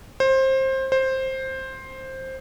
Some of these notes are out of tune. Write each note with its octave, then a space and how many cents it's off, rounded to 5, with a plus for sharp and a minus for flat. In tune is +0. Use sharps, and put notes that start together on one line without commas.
C5 +20
C5 +10